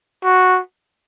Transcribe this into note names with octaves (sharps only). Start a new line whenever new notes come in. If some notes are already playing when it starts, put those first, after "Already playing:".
F#4